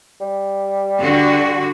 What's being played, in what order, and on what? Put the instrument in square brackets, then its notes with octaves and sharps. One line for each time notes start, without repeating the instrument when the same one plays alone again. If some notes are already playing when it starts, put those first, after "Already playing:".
[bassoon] G3
[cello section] D3 F#4